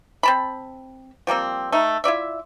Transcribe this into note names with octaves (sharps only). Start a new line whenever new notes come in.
C4 A5 B5
F3 G3 A#3 C4
A3 D#4
E4 F4 D5 E5